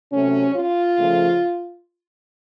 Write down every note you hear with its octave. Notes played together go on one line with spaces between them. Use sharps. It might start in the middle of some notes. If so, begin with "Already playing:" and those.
C3 F#3 A3 C#4
F4
C#3 F3 A3